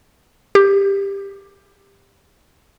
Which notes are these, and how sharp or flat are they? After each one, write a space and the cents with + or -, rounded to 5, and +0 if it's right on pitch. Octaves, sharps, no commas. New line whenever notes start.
G4 +15